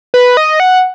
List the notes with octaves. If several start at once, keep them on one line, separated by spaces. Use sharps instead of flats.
B4
D#5
F#5